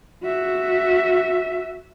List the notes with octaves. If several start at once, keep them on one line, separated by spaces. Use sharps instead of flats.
F#4 E5